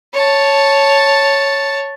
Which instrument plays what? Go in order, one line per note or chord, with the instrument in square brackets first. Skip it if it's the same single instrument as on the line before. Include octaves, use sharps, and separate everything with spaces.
[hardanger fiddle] C#5 A5